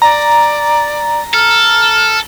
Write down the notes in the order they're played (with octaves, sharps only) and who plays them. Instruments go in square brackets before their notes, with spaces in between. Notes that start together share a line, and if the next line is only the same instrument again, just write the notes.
[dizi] D5 [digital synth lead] A#5
[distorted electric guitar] A4 [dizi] F6